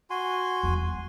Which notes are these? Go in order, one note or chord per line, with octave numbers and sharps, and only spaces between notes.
F#4 G#5 C6
E2 G3